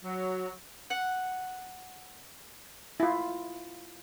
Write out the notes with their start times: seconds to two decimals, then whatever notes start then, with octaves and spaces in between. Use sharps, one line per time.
0.04 F#3
0.90 F#5
3.00 E4 F4